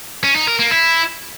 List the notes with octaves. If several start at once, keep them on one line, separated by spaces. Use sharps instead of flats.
C#4
D#4
A#4
A#3
E4